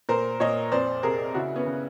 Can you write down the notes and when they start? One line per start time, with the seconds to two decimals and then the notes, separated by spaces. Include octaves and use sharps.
0.09 A#2 A#4 C5
0.40 A#2 C#5 D#5
0.72 F2 C5 D5
1.03 C3 G#4 A#4
1.34 C#3 E4 F#4
1.56 B3 C#4
1.66 C#3